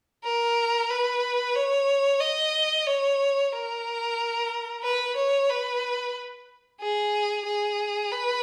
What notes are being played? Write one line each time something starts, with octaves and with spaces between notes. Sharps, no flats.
A#4
B4
C#5
D#5
C#5
A#4
B4
C#5
B4
G#4
G#4
B4